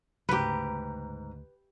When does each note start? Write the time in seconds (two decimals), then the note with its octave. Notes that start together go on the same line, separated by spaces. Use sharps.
0.29 D2 G#2 C#3 A3 G4 B4 A#5